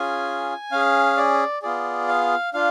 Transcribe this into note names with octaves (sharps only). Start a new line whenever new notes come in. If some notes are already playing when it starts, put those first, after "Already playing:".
Already playing: C#4 F4 G#4 G#5
C#4 G#4 F5
D5
B3 F4 G#4 D5
F5
D4 F4 F5